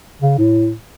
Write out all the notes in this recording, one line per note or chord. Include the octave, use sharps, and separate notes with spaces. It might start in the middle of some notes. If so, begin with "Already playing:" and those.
C#3
A2